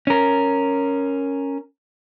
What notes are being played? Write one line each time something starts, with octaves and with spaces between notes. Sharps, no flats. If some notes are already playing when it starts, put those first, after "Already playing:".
C#4 A#4